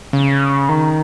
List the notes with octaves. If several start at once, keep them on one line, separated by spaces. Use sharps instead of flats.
C#3
D#3